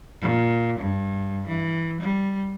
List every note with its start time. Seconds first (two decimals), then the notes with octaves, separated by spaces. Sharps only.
0.21 A#2
0.79 G2
1.47 E3
2.00 G3